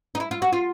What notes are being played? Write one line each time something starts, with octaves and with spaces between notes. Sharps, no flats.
D#4
E4
F4
F#4
F4